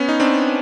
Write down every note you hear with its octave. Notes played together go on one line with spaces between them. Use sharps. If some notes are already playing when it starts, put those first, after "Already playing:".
Already playing: B3 C#4
D#4
C4 D4